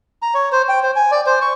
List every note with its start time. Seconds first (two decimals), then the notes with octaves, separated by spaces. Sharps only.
0.22 A#5
0.34 C#5
0.52 C5
0.69 G5
0.83 C5
0.96 G#5
1.11 D5
1.26 C5
1.42 C#6